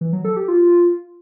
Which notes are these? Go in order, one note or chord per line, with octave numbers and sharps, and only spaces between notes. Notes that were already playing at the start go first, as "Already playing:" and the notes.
E3
F#3
A4
G4
F4